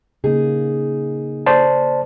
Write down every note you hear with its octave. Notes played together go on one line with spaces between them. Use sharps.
C#3 A#3 D#4 G#4
A4 C5 D5 A5